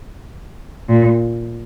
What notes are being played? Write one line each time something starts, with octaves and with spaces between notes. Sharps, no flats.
A#2